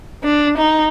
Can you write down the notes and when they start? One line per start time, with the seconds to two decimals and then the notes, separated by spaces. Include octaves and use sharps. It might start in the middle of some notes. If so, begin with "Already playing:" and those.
0.24 D4
0.58 D#4